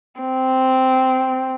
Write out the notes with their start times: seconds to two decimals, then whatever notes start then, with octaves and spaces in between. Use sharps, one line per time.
0.21 C4